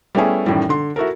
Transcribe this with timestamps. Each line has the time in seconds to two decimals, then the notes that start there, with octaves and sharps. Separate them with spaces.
0.15 G3 A3 B3 C#4 E4 G#4
0.46 F#2 A2 D#3 E3 G3
0.69 D3 C6
0.96 E4 F#4 A4 A#4